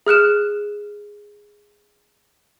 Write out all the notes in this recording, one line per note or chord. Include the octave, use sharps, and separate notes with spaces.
G#4 F6 F#6 E7